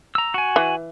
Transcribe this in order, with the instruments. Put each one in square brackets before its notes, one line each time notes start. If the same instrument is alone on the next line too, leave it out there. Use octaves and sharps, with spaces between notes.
[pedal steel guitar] A#5 E6
F#4 G#5
[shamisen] E3